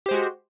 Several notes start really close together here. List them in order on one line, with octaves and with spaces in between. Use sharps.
G4 C5 G#3 F#4